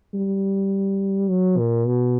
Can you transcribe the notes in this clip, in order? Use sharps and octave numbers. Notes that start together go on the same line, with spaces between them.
G3
F#3
A#2
B2